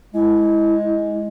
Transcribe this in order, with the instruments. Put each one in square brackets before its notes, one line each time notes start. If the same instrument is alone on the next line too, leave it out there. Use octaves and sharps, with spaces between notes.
[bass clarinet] G#3 [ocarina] E4